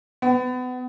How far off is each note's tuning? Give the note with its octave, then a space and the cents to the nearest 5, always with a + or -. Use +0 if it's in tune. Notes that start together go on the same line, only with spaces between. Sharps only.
B3 +30